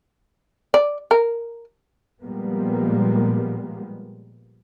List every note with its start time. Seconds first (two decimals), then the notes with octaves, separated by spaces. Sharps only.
0.74 D5
1.11 A#4
2.23 A#2 F3 G3 G#3 A#3 B3